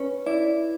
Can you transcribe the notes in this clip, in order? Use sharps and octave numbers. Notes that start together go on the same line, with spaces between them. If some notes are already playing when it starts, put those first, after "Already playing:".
Already playing: C#4 B4
E4 D5